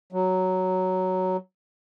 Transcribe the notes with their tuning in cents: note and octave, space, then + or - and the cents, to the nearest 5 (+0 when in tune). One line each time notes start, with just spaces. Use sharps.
F#3 +5